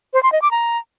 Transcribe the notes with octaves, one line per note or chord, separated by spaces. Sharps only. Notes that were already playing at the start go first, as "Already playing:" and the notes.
C5
C6
D#5
D6
A#5